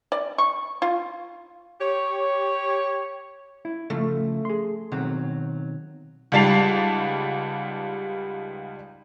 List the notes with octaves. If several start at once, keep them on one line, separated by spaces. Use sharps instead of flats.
D5
C#6
F4
G4 C#5
E4
C#3 F3 A3
G#4 C6
B2 D#3 F#3 C4
C#2 G#2 G3 A5 C7 F7